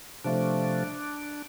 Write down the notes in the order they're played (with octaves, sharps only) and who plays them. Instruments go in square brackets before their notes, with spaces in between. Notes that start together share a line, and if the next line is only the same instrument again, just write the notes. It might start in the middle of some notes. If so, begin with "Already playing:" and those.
[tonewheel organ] C3 F3 A3 D4